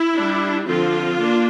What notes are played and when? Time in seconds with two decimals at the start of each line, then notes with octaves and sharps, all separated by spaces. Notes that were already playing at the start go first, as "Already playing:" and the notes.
Already playing: E4
0.14 G3 D4
0.66 D3 F3 C4 F4
1.18 A#3 D4